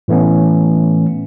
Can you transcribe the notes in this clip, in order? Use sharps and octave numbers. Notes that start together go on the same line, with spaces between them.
A2 E3 A3 B3 C#4